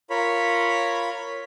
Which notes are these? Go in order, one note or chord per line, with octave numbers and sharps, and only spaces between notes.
F4 A#4 C#5 B5